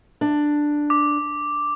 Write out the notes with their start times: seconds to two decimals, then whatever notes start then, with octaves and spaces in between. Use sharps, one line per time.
0.21 D4
0.90 D6